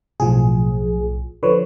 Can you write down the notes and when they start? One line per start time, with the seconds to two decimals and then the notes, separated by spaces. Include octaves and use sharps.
0.20 B1 A2 F3 G#4
1.43 D3 F3 B4 C#5